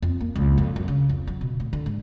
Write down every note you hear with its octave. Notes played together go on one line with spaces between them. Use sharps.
F2
A#3
C#2
F2
F#2
C#3
F2
F#3
B2
A2
D3
G#2